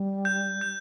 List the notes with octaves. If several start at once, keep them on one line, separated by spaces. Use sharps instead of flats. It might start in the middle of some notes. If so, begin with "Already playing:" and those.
Already playing: G3
G6
G6